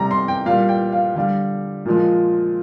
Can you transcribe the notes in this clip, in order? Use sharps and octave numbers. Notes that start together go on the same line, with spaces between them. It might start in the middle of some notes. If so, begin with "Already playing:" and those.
Already playing: C3 G3 A#5
C6
G5
A#2 G3 F5
G5
F5
D3 G3 F5
A#2 F3 G#3